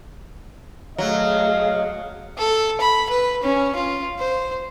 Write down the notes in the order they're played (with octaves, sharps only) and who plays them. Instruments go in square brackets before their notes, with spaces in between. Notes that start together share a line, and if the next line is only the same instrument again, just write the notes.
[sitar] F#3 [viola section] A3 G#4 [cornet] D#5 [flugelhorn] F5
[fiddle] A4
B5
B4
C#4
F4
C5